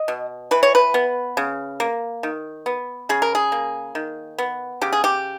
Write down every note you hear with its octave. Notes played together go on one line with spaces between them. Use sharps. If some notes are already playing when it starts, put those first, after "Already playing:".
Already playing: D#5
B2
E3 B4
C#5
B4
B3
C#3
A#3
D#3
B3
C#3 G#4
A#4
G#4
A#3
D#3
B3
C#3 G4
G#4
G4